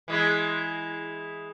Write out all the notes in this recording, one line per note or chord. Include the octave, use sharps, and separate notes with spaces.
E3 G#3 E4